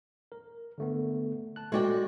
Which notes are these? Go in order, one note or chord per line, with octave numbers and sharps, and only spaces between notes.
A#4
D3 A3 B3
A5 F#6
G#3 A3 F#4 D5 G5